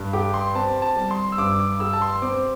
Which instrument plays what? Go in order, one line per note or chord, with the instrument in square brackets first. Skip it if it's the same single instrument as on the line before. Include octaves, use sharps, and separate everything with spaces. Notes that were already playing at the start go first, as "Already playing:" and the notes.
Already playing: [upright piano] G2
[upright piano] G4 [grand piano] D6
[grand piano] C6
[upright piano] C4 [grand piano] A5
[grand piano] A5
[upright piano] G3
[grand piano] C6
E6
[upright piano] G2 [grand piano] D6
[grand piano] D6
[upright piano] G4 [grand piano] E6
[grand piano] A5
C6
[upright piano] C4 [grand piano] D6